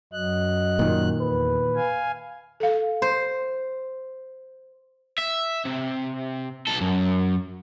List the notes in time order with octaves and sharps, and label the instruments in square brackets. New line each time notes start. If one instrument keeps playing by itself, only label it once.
[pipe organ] F#2 F#3 F#6 [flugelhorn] D#5
[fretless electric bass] A#2 D#3
[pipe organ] E2 [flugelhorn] B4
[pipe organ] F5 G#5
[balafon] A4 F5
[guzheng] C5
[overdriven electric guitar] E5
C3
B1 A4
F#2